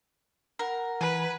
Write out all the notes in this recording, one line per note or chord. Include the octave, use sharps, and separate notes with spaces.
A#4 F#5 A#5
E3 B4 G#5